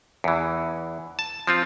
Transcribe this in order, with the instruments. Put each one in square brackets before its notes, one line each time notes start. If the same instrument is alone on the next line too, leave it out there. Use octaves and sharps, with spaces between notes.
[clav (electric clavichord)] E2 E3
A5
F3 C4 F4